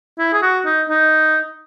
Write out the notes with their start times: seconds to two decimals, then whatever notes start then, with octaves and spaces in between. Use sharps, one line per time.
0.19 E4
0.33 G#4
0.42 F#4
0.66 D#4
0.89 D#4